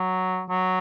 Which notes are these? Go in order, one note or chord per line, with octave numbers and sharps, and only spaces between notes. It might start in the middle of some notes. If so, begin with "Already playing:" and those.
Already playing: F#3
F#3